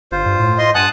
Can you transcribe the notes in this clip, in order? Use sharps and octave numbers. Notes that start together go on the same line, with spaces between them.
G1 F4 C5
G2
A2
D#5 C6
G2 F#5 G#5 A5 D#6 F#6